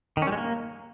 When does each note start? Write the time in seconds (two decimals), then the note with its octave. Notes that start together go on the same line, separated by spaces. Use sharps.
0.17 D#3
0.22 C#4
0.27 G3
0.32 G#3
0.37 A#3